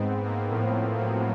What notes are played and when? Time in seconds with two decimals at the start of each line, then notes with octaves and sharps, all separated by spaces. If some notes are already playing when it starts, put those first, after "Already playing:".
Already playing: G#2 B3 C4
0.23 A#3
0.52 A2 F3
0.97 F#3